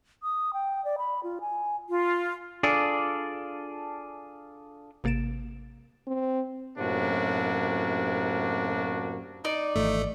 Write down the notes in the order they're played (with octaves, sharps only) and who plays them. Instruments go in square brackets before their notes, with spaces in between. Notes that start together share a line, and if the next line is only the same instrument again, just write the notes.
[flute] D#6
G5
D5
B5
F4
G#5
[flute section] F4
[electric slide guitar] D4 F4 G#4 A4 D5
[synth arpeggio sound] G#1 C3 A#3 A6 D7 E7
[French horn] C4
[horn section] F#2 A2 C3 A#3 D4 F#4
[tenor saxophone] D#4 [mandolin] D5
[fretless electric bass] G#1 E3 F3 [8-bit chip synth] A3